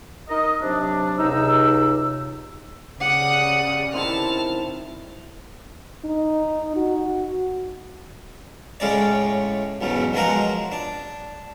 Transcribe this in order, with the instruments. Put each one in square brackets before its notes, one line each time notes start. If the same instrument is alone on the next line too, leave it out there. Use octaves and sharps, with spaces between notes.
[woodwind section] D#4 A#4 D#5
C3 F#3 D4
[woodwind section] C#2 C3 E6 [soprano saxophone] D#4
[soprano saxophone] D#4
[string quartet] C#3 [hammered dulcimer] G4 D5 [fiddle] F#5 D#6
[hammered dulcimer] D#3 C4 E4 [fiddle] A5 F6
[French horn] D#4
F#4
[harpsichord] A2 C#3 G#3 C#4 D5
B1 E2 G#2 C#3
B2 F3 F#3 G#3 A#4 F#5
D4